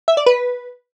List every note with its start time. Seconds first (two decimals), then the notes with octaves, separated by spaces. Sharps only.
0.08 E5
0.17 D5
0.26 B4